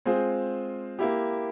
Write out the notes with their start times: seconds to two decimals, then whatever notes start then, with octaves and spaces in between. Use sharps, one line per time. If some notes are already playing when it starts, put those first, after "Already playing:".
0.05 G#3 C4 F4 G#4 C5
0.99 A#3 E4 G4